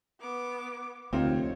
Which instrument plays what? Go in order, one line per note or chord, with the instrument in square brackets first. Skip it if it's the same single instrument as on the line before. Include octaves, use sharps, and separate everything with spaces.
[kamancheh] B3 D6
[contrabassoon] F1 [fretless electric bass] D2 [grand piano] C4 D#4 F4 [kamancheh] C#5